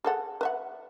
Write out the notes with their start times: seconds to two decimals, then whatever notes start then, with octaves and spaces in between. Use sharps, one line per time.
0.04 G#4 A4 F#5
0.41 B4 E5 F#5